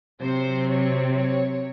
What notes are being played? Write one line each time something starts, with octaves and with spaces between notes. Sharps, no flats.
C3 F#3 C4 C5
C#5
C#5